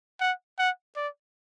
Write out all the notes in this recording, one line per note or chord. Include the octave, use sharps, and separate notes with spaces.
F#5
F#5
D5